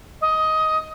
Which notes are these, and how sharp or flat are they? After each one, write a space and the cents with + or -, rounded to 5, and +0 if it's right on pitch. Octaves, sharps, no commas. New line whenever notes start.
D#5 +15